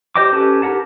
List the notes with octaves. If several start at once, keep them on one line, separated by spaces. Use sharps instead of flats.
G4 C5 D#5 G5 D6
C#4 G4 A4 B4 A5
D#4 G4 A#4 F#5 A5